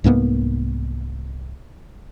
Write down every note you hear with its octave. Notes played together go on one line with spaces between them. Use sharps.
C2 G#2 A#3 B3